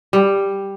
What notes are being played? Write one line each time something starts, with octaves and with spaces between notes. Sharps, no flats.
G3